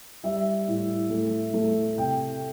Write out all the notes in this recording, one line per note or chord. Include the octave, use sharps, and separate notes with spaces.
G3 E5
A2
A3
A3
C3 G5